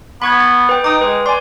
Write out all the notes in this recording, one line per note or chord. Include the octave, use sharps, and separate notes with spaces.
B3 B5 C#6 G#6
A6
B4 G5
D#4 D6 D#6
G#3 B4
D5 G#5 C6